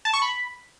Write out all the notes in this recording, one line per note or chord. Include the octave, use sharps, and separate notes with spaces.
A5
C#6
B5